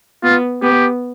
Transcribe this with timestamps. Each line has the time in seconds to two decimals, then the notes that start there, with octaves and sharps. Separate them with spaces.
0.23 B3 F4
0.63 B3 G4